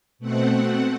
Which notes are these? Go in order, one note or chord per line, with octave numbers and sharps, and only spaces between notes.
B2 A3 C4 F#5